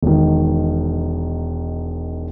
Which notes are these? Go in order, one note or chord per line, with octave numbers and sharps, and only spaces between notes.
E1 D#3